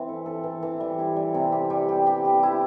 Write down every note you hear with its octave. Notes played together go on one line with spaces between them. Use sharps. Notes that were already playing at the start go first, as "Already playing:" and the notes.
Already playing: E3 C4
A4
A4
E3
E3
G3
E4
G3
C3
G4
G3
G4
G4
G4
E4